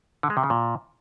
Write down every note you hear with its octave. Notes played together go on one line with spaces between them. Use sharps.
D3
G#3
C3
C#3
A#2